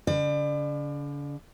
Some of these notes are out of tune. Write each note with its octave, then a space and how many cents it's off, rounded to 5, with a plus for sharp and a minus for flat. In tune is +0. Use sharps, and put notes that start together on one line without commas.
D3 -45 D5 +30